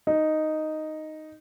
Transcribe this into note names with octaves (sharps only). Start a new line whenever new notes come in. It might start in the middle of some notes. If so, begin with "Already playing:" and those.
D#4